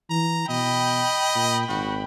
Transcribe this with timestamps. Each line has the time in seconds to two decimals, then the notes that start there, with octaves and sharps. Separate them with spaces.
0.10 E3 A#5
0.49 B2 D#5 G5 B5
1.35 A#2
1.69 G#1 F#4